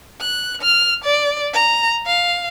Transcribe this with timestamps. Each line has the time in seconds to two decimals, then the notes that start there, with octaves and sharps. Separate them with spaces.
0.21 F#6
0.62 F6
1.04 D5
1.53 A#5
2.06 F5